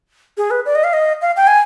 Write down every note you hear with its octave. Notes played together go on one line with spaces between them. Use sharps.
G#4
B4
D5
D#5
F5
D#5
F5
G5
G#5